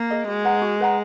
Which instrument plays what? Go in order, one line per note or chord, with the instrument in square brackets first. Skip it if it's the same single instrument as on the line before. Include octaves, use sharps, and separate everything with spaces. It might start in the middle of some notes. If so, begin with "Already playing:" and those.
Already playing: [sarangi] A#3
[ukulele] G#4 D#5
[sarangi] G#3 [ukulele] F#4
[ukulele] B4 F#5 A#5
F#4
B4 F#5 A#5